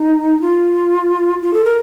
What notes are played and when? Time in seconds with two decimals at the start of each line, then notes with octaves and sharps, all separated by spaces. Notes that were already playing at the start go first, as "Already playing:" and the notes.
Already playing: D#4
0.41 F4
1.42 F4
1.54 A4
1.65 A#4